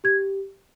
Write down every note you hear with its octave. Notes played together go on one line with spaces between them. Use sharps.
G4 G#6